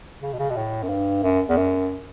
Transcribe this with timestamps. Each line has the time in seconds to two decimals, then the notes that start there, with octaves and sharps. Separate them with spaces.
0.22 C#3
0.33 B2
0.39 C#3
0.50 B2
0.56 A2
0.83 F#2
0.89 G2
1.23 F#2
1.49 E2
1.57 F#2